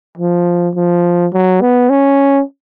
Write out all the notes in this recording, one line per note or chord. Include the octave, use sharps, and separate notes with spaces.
F3
F3
F#3
B3
C#4